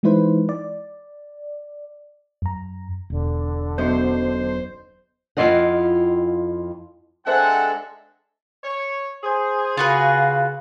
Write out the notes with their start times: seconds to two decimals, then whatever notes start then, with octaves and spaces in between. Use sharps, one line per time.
0.03 E3 G#3 D#4 E4 B4 C5
0.49 D5
2.42 F#2 A#5
3.10 E1 D3
3.78 B1 F#2 B2 C5
5.37 F2 G#3 E4 F4 D#5 F#5
7.27 G#3 C4 D4 A4 C5 E5 F#5 G#5
8.64 C#5
9.24 G#4 C5
9.77 C#3 F4 F#4 B4